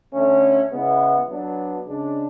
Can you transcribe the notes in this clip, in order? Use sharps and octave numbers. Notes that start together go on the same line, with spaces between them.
D3 A3 C#4
C#3 G#3 B3 E4
F#3 B3 D4
C#3 G#3 D4